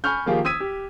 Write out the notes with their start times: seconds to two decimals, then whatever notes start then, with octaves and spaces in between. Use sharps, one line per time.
0.04 G#5 B5 C#6 F6 G6
0.26 D#3 F3 A#3 F4 G4 G#4
0.45 D#6 E6 G#6 B6 D#7
0.60 G4